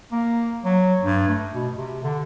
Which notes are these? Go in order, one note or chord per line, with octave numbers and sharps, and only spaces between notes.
A#3
F#3
G2
A3
B2
C3
D3